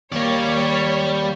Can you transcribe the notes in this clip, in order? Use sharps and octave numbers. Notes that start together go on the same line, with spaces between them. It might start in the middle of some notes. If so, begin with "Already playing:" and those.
D#2 G3 A#3 C#5 D5